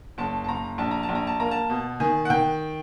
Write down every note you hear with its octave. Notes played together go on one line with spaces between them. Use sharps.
F#1 A5
A5
F#1 A#5
A#1 A5
A#5
A5
A#1
A#5
A5
A#3 A#5
A5
B2
D#3 G#5
F#5
D#3 G5